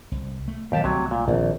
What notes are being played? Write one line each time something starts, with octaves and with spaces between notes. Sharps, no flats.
C2
A3
D#2 B2 E3 F#3 G4 A5
C2 C3 F#3 A3
A#2
A#1 A#2 D#3 C4